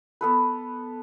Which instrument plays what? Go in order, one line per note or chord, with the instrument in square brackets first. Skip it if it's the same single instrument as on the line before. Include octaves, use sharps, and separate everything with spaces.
[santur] B3 A4 B4